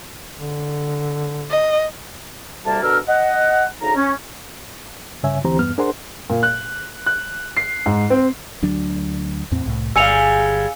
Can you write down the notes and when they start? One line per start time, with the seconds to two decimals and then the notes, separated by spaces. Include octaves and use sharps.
0.37 D3
1.50 D#5
2.65 D2 C3 G3 A#3 A5
2.83 B2 D3 D4 A#4 E6 F6
3.08 D#5 F#5
3.81 D2 C#3 D#4 A#5
3.96 C#4
5.23 G2 C#3 C#5 E5 G#5
5.44 D2 E3 C4 G4 C5 A#5
5.59 E2 G2 B3 F6
5.78 D4 G#4 A#4 C5 F#5 C6
6.30 A#2
6.43 F#6
7.06 F#6
7.57 C7
7.86 G#2
8.10 C4
8.62 D2 F#3 D4
9.51 E2 A2 C4
9.66 C2 A2
9.96 G1 G3 G#3 F5 G#5 E6 C#7 F7